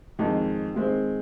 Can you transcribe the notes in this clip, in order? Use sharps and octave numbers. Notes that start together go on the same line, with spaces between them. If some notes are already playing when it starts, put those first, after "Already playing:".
F2 D#3 G#3 D#4
D#3 G#3 C4